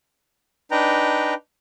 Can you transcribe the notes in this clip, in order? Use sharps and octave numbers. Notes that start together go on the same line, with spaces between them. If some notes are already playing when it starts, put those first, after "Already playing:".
D4 D#4 B4 G5 A#5